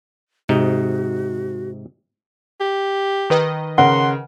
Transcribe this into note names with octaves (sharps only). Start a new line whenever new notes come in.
G#2 C3 D#4 F#4
G4
D#3 B4 D#5
C#3 A#4 F#5 C6